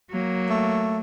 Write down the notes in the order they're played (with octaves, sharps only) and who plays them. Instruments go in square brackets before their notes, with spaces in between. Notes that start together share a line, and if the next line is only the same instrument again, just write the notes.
[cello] F#3 A#3
[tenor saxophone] A3